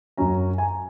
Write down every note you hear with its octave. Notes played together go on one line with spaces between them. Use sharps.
F#2 F#3 C#4 A#5
G#5
A#5